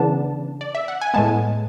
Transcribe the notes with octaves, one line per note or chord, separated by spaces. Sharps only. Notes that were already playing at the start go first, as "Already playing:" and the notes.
Already playing: C#3 E3 B3 D4 A5
D5
E5
F#5
G#5
A2 G#3 B3 A5